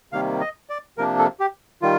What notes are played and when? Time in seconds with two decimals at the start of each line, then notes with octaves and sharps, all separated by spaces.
0.12 C3 D#3 G3 A#3 F5
0.41 D#5
0.70 D5
0.98 C3 F3 A#3 D4 A#4
1.19 A4
1.40 G4
1.82 D#3 G3 F4